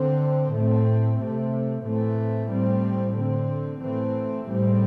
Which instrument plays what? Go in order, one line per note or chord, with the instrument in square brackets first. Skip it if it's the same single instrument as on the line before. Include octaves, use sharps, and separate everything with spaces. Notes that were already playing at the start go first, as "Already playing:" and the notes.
Already playing: [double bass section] D3 C4
A2 A3 C4
C3 A3 C4
A2 E3 A3 C4
A2 G3 C4
D3 C4
A2 E3 A3 C4
A2 G3 C4